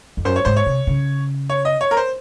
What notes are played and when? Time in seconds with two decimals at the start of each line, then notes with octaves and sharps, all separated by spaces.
0.17 F2
0.25 F#2 C5
0.36 C#5
0.45 G#2 C5
0.57 C#5
0.66 C3
0.87 C#3
1.50 C#5
1.65 D#5
1.81 C#5
1.91 A#4
1.97 C5